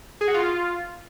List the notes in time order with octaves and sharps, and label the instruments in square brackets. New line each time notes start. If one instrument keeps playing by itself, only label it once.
[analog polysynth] G#4
F#4
F4